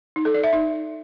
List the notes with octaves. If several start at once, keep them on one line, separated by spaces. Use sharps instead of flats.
D#4
A4
D5
E5
D#4